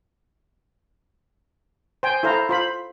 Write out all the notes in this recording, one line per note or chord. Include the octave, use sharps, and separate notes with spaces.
C5 G5 G#5
E4 A4 C5 F5 A#5
F4 C5 B5